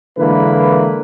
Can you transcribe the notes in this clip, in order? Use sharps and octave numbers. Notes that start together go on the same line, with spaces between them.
D3 E3 G#3 A#3 E4 B4